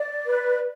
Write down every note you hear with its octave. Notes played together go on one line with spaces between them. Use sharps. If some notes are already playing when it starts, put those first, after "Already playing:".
Already playing: D5
B4